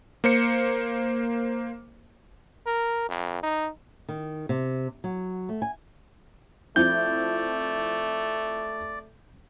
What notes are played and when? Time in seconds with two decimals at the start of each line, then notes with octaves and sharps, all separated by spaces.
0.24 A#3 C5 C#7
2.67 A#4
3.09 F2
3.43 D#4
4.09 D#3
4.49 C3
5.04 F#3
5.49 A3
5.62 G#5
6.76 F3 A3 C4 E4 D5 G6